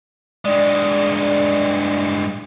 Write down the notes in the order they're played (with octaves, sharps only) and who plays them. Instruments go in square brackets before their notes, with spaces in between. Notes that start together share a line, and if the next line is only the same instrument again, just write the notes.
[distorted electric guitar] G2 G#3 [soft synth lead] D5